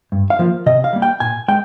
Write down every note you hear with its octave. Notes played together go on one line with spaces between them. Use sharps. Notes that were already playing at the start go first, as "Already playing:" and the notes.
G2
F5
F3 A#3 F4
C3 D#5
F5
G3 A#3
G5
A#2 G#5
G#3 G5